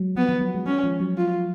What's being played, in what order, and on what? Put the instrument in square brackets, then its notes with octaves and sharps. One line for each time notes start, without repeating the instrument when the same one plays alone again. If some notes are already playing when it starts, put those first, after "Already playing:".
Already playing: [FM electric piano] F#3 G#3
[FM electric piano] F3 [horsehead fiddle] B3
[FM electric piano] D#3
F#3
G#3
[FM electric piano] G#3 [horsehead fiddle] C#4
[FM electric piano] F3
F#3
[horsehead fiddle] F4